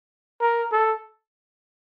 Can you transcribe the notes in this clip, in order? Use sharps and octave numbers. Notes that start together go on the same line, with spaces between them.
A#4
A4